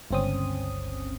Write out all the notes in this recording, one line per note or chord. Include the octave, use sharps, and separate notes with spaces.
G1 C#2 C4 C#4 D#6